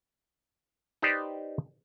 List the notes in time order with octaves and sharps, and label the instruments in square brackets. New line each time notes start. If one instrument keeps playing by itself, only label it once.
[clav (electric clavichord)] D#4 G4 B4 C5 D5